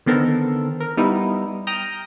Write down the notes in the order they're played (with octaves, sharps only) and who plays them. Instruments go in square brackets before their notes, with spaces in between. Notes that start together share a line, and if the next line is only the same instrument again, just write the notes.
[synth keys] D3 D#3 B3 C4 A4 A#4
A#4
G3 B3 D#4 E4
G5 A#5 D#6 F6 G6 A#6